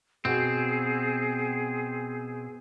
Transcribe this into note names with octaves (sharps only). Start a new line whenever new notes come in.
B2 C4 G#4